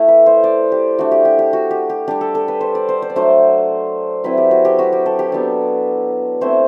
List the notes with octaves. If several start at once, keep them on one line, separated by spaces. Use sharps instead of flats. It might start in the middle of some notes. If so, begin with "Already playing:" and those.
Already playing: A3 E4
B4
C5
D5
G4
A3 D4 F#4
G4
G4
G4
F#4
G4
G4
G3 D4 G4
A4
A4
B4
C5
D5
C5
C5
D5
F#3 A3 D4 C5
F#3 C4 E4 B4
G4
F#4
G4
F#4
G4
A4
G4
F#3 B3 D4
A3 C4 E4 C5